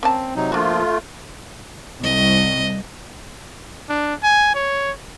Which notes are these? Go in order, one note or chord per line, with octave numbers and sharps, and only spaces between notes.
A#3 C4 C#4 A5
C3 F#3 D#4
F3 A3 A#3 D4 F4 F#4
C2 D#5
D4
G#5
C#5